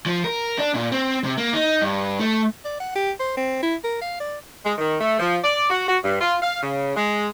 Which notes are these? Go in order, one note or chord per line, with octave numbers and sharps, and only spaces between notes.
F3
A#4
D4
A#2
C4
C3
A#3
D#4
G2
A3
D5
F#5
G4
C5
C4
E4
A#4
F5
D5
G#3
D#3
A3
F3
D5
F#4
F#4
G2
F4
F5
C#3
G#3